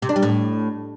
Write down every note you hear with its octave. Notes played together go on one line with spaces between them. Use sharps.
C3
D4
G3
A2